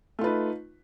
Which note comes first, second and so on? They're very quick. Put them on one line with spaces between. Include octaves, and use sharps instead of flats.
A3 F4 B4 D#4